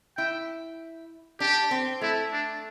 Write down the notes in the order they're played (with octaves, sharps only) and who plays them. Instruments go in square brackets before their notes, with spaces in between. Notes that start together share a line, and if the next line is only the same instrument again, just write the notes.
[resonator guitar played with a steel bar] E4 [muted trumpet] G5
[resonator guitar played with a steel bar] D4 [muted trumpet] G4
[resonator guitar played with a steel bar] C4
[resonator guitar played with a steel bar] A3 [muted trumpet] E4
[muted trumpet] D4